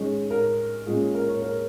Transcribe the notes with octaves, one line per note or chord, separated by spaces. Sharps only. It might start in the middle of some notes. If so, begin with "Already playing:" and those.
Already playing: D#3 G#3 C#4 G#4
A#4
A#2 G#3 C#4 G#4
G#4
A#4
C#5
A#4